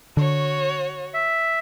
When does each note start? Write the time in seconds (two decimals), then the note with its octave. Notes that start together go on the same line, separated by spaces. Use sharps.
0.17 D3 F#4 C#5
1.14 E5